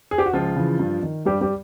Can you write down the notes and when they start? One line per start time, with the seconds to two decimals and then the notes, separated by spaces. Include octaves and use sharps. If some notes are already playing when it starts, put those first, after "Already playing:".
0.11 G#4
0.18 G4
0.26 F#4
0.33 C#2 F3 F4
0.56 C#3 E3
0.79 G2
1.03 D#3
1.25 G2 G3 G4
1.41 G3 G4